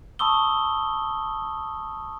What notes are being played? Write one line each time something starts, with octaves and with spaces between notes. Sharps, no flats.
A5 B5 C#6 D#6 E6 G7